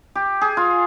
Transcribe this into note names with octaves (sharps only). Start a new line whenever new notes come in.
G4
G#4
F4